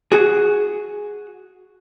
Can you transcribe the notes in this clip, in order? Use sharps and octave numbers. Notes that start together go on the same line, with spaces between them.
F#4 G#4